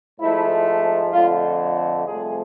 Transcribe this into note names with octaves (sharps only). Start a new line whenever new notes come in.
G#2 F3 A3 E4
F2 D3 A3 F4
C2 C3 F3 A3 G#4